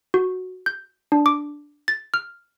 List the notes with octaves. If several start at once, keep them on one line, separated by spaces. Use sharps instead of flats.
F#4
G6
D4
D6
A6
F6